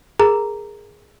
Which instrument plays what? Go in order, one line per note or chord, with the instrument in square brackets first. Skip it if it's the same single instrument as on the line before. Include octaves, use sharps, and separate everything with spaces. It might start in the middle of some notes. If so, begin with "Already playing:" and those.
[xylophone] G#4 A#4 A#5